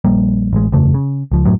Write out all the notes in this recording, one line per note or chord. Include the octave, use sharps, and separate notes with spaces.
A#1 G3 A#3
A1 G#3
F#1 E2 C#3 A3
C#3
C#2 F3
F#2 A2 F#3